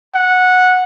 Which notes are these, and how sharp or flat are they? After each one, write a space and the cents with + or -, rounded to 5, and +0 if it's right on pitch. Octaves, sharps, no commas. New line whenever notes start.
F#5 -10